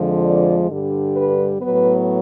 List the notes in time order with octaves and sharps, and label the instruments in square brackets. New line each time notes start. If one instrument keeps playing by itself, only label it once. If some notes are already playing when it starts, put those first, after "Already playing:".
Already playing: [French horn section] F2 D3 F3 G#3
D5
G2 D3 G3
B4
A2 F#3 B3 B4